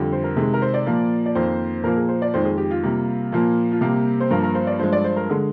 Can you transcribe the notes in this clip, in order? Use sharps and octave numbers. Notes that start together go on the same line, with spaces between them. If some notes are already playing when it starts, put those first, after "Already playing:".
Already playing: F2 D3 G3
C5
A#4
C3 D#3 G#3 G#4
A#4
C5
D5
A#2 F3 A#3
D5
F2 D#3 A#3 C5
A#2 F3 A#3 A#4
G#4
C5
D5
F2 D#3 G#3 C5
G#4
G4
F4
C3 G3 A#3
A#2 F3 A#3
F4
C3 G3 A#3 G4
C5
G2 F3 A#3 A#4
A#4
C5
D5
G2 F3 G#3 C5
D5
C5
A#4
D3 G#3 G#4